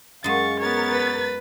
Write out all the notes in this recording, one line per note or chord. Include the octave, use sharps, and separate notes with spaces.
F#2 G#3 F5 C#6 A6
B3 A#4 C#5 A6
B4